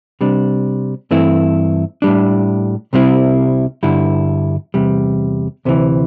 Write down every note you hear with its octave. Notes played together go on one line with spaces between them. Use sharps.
C3 G3 D4
G2 E3 A3 C4 E4
A2 G3 D4
C2 C3 G3 C4 E4
G2 D3 G3 E4
E2 C3 G3
D2 C3 E3